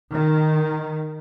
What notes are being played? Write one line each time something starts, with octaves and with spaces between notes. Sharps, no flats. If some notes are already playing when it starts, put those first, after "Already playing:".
D#3